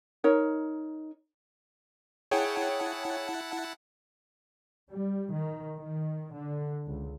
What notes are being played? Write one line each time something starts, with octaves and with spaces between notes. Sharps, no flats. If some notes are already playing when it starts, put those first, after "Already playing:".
D#4 A#4 C#5
E4 G#4 C#5 F#5 G5 A5
G3
D#3
D#3
D3
C#2